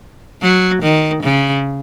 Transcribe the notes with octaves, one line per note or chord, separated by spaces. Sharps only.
F#3
D#3
C#3